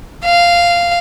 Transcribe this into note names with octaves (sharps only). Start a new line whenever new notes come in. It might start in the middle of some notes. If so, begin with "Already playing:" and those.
F5